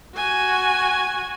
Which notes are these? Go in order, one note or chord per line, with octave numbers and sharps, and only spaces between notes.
F#4 G#5